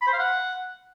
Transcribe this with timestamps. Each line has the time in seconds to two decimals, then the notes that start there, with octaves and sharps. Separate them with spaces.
0.02 B5
0.07 C5
0.13 F5
0.19 F#5